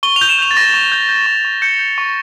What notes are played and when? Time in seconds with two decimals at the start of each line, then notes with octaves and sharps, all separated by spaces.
0.03 C#6 G7
0.16 F7
0.21 G6
0.29 E7
0.39 G6 F7
0.51 A6
0.57 C#6 A#6
0.74 C#6
0.92 G6
1.09 G6
1.26 C#6
1.45 C#6
1.62 G6 C#7
1.79 G6
1.98 C#6